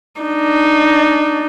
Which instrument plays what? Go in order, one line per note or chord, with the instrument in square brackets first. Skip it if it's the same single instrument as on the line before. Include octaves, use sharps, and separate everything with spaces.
[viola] D4 D#4